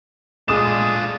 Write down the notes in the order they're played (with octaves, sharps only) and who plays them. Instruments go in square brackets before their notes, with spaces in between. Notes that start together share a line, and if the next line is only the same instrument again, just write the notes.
[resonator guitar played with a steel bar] A#2 A3 G#4 [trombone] G#3 [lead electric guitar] D4 F4 [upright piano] D#6 E7